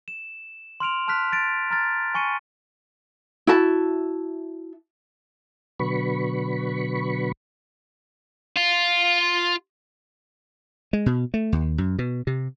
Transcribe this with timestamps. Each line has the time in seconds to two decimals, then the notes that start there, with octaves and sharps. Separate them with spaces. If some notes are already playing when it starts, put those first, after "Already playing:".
0.08 E7
0.80 C6 F6 D7 F7
1.08 A5 C6 F6 F#6 B6
1.32 A6 D7
1.70 A#5 F6 A6
2.15 G#5 C#6 C#7 D#7
3.47 E4 F#4 E5 A5
5.80 B2 D3 F#3 B4 B5 C#6
8.56 F4
10.93 G#3
11.06 B2
11.34 A3
11.52 D#2
11.78 F#2
11.99 B2
12.27 C3